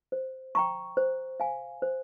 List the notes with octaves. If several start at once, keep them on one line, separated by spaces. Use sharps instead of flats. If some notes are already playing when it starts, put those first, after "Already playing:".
C5
G5 A#5 C#6
C5
F5 G#5
C5